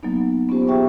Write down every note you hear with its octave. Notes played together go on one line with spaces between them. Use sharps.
F#3 A#3 B3 D#4
B3 C#4 F4 G4 C5
G4 G#4 E5 G5 C#6